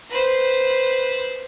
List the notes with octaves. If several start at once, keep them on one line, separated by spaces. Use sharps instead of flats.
B4 C5